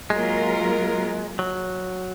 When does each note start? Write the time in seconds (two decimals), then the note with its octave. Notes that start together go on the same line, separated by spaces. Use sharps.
0.10 F#3 G#3 A#3 F4 A#4
1.39 F#3